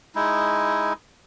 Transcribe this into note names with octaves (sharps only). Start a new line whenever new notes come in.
G#3 D#4 E4